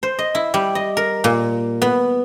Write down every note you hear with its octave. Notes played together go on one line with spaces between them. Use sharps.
C5
D#5
E4
G3
D#5
A#4
A#2
B3